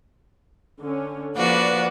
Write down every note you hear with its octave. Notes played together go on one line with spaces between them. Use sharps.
D3 C#4
F3 A#3 F#4 B4 D5 F#5